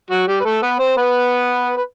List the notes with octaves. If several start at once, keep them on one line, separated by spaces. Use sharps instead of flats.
F#3 F#4
G3 G4
B4
A3 A4
B3 B4
C4 C5
B3 B4
B4